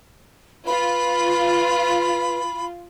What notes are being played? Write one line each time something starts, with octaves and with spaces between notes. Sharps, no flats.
F4 B4 B5